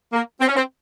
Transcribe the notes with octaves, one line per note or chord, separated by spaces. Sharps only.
A#3
C4
C#4
C4